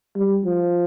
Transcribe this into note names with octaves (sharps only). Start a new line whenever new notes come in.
G3
F3